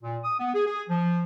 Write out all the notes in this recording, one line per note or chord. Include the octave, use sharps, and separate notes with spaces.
A#2
D#6
B3
G#4
G#4
F3